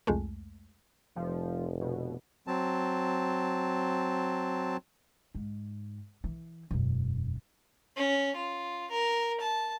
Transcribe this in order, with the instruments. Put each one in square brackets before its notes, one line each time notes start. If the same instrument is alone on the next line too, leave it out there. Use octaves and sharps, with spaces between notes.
[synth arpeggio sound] C2 F2 G#3 A3
[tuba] F1 [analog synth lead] F3
[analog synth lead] B2
[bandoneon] F#3 C4 A5
[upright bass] G#2
E3
E1 F#2
[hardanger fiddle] C#4
F4
A#4
A5